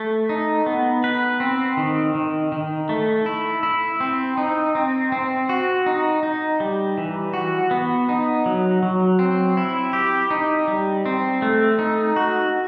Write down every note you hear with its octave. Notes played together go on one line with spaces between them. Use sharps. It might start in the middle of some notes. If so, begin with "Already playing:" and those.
Already playing: A3
D#4
B3
B4
C4
D#3
D#3
D#3
A3
E4
E4
C4
D#4
C4
C4
F#4
D#4
D#4
G3
E3
F#4
B3
D#4
F#3
F#3
C4
E4
G4
D#4
G3
C4
A3
D#4
F#4